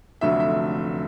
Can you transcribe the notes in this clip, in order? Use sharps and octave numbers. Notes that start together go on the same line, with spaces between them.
F1 F2 D3 F#3 A3 E5
E5